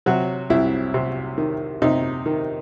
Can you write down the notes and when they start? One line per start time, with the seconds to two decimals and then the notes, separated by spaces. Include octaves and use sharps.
0.06 C3 F#3 F#4
0.50 C2 E4
0.94 C3
1.38 D#3
1.82 C3 D#4
2.26 D#3